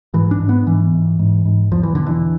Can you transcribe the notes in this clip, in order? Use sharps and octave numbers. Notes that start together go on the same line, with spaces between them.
G#2 E3
D4
G#2
B3
G#2 E3
G#2
G#2
G#2
E2 F3
E3
B2 D3
E3